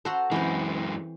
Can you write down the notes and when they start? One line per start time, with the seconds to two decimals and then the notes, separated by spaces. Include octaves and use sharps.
0.05 F#4 A4 C5 A#5 C6
0.32 F#2 E3 G#3 C4 C5